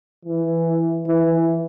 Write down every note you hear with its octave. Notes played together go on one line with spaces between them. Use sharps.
E3
E3